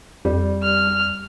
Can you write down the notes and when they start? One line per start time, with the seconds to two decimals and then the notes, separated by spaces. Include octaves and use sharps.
0.25 F2 G3
0.63 F6